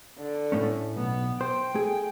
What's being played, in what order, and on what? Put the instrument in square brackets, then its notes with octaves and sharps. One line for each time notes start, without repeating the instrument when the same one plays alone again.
[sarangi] D3
[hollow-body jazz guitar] A2 A3 C#4
[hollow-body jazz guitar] B1 [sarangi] B3
[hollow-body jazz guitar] C5 [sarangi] G5
[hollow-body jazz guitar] A3 G#4